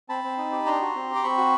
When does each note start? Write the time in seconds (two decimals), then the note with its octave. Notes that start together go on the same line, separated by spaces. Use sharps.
0.09 C4 A5 B5
0.24 C4
0.38 D#4
0.52 G4
0.66 D4 A#5 C6
0.81 F#4
0.95 C4
1.09 G4
1.16 D6
1.23 C4 B5 C#6
1.37 F#4